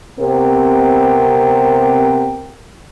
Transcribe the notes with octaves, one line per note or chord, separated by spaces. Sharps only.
C3 B3 C4 G4 A#4